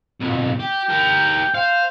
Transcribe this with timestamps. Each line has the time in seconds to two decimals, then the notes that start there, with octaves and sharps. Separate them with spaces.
0.20 B1 F2
0.59 G4 G5
0.89 G4 A#4
1.54 C5 F5